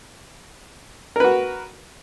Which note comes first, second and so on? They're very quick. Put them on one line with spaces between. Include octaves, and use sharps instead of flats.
A#4 B4 F#4